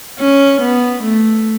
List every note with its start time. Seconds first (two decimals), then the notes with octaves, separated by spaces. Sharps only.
0.20 C#4
0.61 B3
1.03 A3